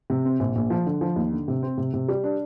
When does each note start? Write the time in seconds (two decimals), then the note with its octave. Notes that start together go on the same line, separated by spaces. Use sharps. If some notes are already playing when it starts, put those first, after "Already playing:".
0.10 C3
0.25 C4
0.40 A#1
0.56 A#1
0.70 F3
0.87 D3
1.01 F3
1.16 D#2
1.32 D3
1.48 C3
1.63 C4
1.78 C3
1.93 C3
2.08 G3
2.24 D4